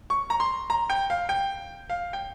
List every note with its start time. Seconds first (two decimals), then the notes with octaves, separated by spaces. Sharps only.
0.10 C#6
0.30 A#5
0.40 C6
0.70 A#5
0.90 G5
1.10 F5
1.29 G5
1.90 F5
2.13 G5